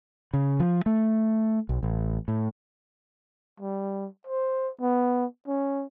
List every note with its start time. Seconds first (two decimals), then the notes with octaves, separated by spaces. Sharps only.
0.34 C#3
0.60 F3
0.86 A3
1.69 B1
1.83 A1
2.28 A2
3.60 G3
4.27 C5
4.81 B3
5.47 C#4